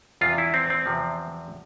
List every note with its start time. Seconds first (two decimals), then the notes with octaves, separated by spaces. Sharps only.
0.21 E2 C3 F3 F4
0.38 E4
0.54 C4
0.70 C4
0.86 E2 C3 F3